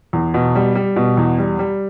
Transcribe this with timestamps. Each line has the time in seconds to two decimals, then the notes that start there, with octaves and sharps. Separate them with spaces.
0.13 E2
0.34 B2
0.55 G3
0.75 G3
0.96 B2
1.17 E2
1.38 G3
1.59 G3